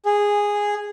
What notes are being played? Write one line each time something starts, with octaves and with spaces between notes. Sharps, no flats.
G#4